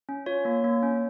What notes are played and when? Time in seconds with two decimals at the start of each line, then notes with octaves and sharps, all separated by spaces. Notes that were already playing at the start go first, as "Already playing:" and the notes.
0.09 C#4
0.26 F4 C#5
0.45 A#3
0.64 A#3
0.83 C#4